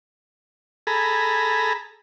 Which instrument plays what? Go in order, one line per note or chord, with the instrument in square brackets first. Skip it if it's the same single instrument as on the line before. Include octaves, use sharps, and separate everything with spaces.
[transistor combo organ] G#4 A4 A#5 B5